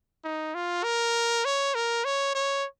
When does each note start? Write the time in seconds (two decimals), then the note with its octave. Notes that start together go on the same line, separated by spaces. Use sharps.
0.24 D#4
0.54 F4
0.84 A#4
1.45 C#5
1.75 A#4
2.05 C#5
2.35 C#5